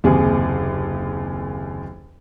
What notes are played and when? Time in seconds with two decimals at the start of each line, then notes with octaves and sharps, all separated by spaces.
0.04 F#1 D#2 C3 G#4